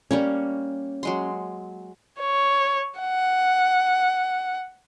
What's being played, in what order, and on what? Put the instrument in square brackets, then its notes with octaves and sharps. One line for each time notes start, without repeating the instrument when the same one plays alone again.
[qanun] G3 A#3 C#6 [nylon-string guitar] C#4
[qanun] F#3 G#3 C6
[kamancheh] C#5
F#5